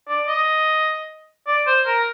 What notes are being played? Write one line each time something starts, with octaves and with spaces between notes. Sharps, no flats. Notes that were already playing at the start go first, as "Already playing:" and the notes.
D5
D#5
D5
C5
A#4